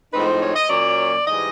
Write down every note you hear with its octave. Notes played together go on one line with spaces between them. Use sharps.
A2 F3 G#3 C4 D#4 B4
C5
C#5
D#5
A#2 F#3 A#3 C#4 D5
G#2 E3 G3 D#5